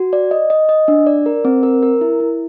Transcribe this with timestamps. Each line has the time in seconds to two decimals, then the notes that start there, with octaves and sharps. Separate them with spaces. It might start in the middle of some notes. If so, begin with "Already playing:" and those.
Already playing: F#4
0.13 D5
0.31 D#5
0.50 D#5
0.69 D#5
0.88 D4
1.07 D5
1.26 A#4
1.45 C4
1.63 A#4
1.83 A#4
2.01 E4
2.20 E4